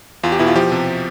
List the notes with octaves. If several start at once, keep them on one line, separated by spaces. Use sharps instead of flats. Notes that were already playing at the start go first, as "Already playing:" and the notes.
E2 F4
G4
B2 E4
F4
F3 G4
C3